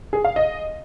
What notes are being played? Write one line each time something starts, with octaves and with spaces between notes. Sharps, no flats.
G#4
F5
D#5